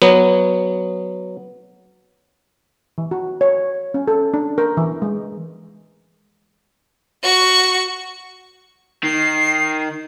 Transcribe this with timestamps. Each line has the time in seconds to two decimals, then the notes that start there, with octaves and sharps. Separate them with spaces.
0.02 F#3 B3
2.98 E3
3.11 F#4
3.41 C#5
3.94 C#4
4.08 A4
4.34 D4
4.58 A#4
4.77 E3
5.02 G#3
7.23 F#4 C#6
9.03 D#3 C7